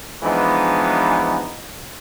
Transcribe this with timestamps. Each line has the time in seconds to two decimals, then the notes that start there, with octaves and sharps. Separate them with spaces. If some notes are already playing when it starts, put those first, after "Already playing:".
0.23 E3 F3 G#3 B3 D4 D#4